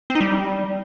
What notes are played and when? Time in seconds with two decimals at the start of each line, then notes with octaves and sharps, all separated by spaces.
0.10 C4
0.15 D#4
0.20 G3